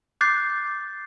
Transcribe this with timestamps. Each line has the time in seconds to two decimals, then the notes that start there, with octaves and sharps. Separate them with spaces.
0.21 D6 F#6 G6 A6 C7